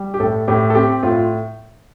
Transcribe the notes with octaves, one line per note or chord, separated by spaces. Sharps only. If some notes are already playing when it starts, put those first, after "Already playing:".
Already playing: G3
G4
A2 A4
A2 G4
A4
C4 G4
A2 F4